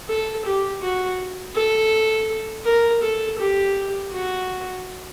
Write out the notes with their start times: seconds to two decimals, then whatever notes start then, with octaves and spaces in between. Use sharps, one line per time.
0.09 A4
0.45 G4
0.82 F#4
1.55 A4
2.65 A#4
3.02 A4
3.39 G4
4.12 F#4